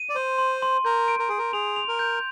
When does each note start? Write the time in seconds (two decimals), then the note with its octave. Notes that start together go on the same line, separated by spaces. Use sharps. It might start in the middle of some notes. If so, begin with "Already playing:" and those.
Already playing: D#7
0.09 D5
0.15 C5 C6
0.38 C6
0.62 C6
0.85 A#4 G6
1.08 D7
1.19 A#4
1.29 G#4 D7
1.38 A#4
1.53 G#4 F7
1.76 F7
1.88 A#4
1.99 G6